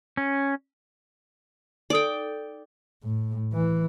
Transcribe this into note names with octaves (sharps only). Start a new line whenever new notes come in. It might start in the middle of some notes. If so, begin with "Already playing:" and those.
C#4
D#4 A4 D5 G5
A2
E3